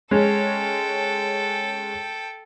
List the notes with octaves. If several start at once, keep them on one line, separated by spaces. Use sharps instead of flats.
G#3 C#4 A4 G5